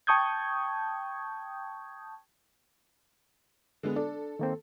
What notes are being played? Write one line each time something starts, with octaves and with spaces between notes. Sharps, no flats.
G5 A5 C#6 D#6 G6 G#6
D3 G#3 B3
D4 A4
D#3 A#3 C4